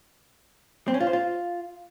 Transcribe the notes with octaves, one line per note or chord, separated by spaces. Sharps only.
C4
C#4
F4
C5
F4